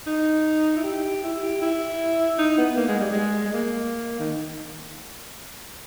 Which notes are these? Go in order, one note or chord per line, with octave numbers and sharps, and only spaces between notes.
D#4
E4
G4
E4
G4
E4
D#4
B3
A#3
G#3
G3
G#3
G#3
A#3
D#3